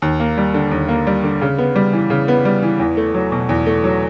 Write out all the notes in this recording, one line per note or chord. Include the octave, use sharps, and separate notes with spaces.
D#2
A#3
G3
D3
D#2
A#3
G3
D3
C#3
B3
G3
E3
C#3
B3
G3
E3
E2
A3
F#3
B2
E2
A3
F#3